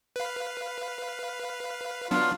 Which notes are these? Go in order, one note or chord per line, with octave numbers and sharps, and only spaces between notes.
B4 F5
F#3 B3 D4 F4